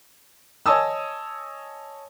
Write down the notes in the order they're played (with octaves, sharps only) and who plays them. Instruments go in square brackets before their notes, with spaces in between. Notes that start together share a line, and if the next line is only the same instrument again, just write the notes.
[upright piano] C#5 D#5 G#5 A5 D#6 E6